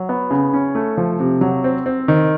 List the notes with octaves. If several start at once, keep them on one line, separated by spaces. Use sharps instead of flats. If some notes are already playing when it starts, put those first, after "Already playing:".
Already playing: F#3
B3
C#3
C#4
A3
F3
C3
F#3
C4
C4
D#3